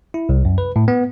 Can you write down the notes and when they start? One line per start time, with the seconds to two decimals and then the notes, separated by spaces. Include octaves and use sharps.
0.14 E4
0.29 C2
0.45 F#2
0.58 B4
0.76 A2
0.88 B3